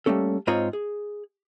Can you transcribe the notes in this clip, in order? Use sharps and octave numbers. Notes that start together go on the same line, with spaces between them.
G3 A3 A#3 C#4 A4
G#2 C4 F4 C#5 D#5 A#5
G#4